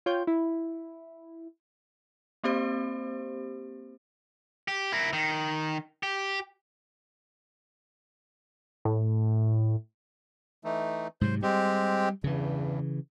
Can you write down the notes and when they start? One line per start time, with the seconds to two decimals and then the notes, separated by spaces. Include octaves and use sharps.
0.06 F4 C#5 G5 G6
0.27 E4
2.44 A#3 C4 G4 C5
4.68 G4
4.92 E4 A#4
5.13 D#3
6.03 G4
8.85 A2
10.64 E3 A3 D#4
11.21 G#2 C3 F#3 C5
11.42 G3 G#3 C4 G4
12.24 E2 G2 C#3 E3